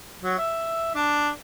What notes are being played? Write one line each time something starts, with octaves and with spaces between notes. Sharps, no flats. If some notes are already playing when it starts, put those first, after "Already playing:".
F#3
E5
D4